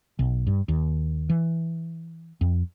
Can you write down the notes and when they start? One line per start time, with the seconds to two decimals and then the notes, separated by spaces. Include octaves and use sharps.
0.19 B1
0.47 G2
0.68 D#2
1.30 E3
2.41 F2